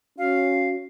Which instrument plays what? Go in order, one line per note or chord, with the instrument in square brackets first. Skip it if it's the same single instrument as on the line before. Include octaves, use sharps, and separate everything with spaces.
[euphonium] C#4 [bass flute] F#4 [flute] F5